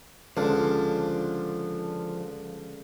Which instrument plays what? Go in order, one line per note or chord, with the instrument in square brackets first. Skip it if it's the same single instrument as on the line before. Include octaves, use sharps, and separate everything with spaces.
[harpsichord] C#2 D3 [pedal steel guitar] F3 D4